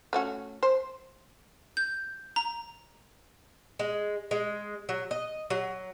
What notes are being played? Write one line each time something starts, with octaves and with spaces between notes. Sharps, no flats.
A3 C#4 F#4
C5
G6
A#5
G#3
G#3
F#3
D#5
F#3